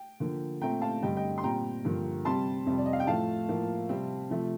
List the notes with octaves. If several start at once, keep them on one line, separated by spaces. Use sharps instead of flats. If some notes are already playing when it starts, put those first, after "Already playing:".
Already playing: G5
D3 F3 A#3
A#2 A3 C4 G5 A#5
F5 A5
G2 D3 G3 C4 D#5 G5
D#5 G5
C6
A#2 G3 C4 G5 A#5
G2 D3 F3 A#3
C3 G3 C4 A5 C6
F2 C3 G3
D5
D#5
F5
G5
A2 F3 A3 F5 A5
A2 F3 A#3
C3 G3 C4
C3 F3 A3